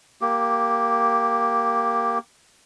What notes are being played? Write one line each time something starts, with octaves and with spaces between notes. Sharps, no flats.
A#3 G4